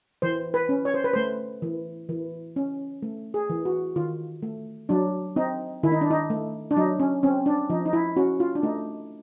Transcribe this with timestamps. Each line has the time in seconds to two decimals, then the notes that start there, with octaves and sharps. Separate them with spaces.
0.22 E3 C5
0.54 B4
0.69 C#4
0.85 C#5
0.94 C5
1.04 B4
1.13 A3 C5
1.62 E3
2.09 E3
2.56 C#4
3.02 A3
3.34 G#4
3.50 E3
3.65 F#4
3.96 D#3 F4
4.42 A3
4.89 F#3 D4
5.36 C4 D#4
5.83 D#3 E4
5.92 D#4
6.01 D4
6.11 D#4
6.30 A3
6.71 D4
6.76 F#3 D#4
7.00 C#4
7.23 C4 C#4
7.46 D4
7.70 F3 D#4
7.86 D#4
7.93 E4
8.16 C#4 F#4
8.40 F4
8.55 D4
8.63 A3 D#4